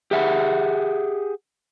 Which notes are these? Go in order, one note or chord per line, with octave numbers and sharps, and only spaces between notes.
G4 G#4 E5 F#5